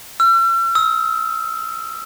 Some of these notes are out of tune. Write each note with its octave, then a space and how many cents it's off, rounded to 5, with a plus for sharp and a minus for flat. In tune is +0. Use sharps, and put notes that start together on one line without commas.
E6 +45
E6 -35